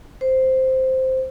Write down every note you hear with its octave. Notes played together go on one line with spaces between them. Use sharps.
C5